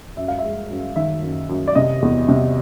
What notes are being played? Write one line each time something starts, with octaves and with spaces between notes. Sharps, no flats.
F#2 E5
F5
E5
G#3
F#2
D#3 E5
F#2
F#2
D5
C3 D#5
E2
C3